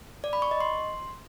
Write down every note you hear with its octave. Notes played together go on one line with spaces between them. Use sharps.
D5
B5
C#6
D#5
C6